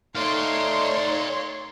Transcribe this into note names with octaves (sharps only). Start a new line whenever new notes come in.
A3 D#4 C#5 D5 F5 C6